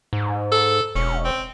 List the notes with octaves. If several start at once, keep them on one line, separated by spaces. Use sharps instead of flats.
G#2
A4
E1 C#4
C4